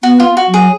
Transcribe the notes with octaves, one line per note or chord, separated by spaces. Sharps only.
B3 F#4
F4
F#4
F#3
G#4